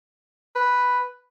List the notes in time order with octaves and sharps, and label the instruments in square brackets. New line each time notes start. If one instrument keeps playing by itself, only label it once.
[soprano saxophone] B4